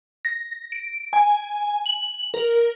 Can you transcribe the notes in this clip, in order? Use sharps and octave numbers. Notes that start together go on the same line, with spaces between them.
A#6
D7
G#5
F#7
A#4